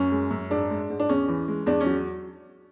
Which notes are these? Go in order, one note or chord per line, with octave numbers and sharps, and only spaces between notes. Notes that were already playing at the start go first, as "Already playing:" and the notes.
Already playing: F#2 C#4
G#3
F#2
G#2 D4
G#3
G#2
D4
E2 C#4
E3
G#3
E2 D4
C#4
F#3